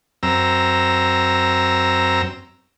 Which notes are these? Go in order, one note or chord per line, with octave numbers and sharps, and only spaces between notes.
F#2 C4 A#5 E6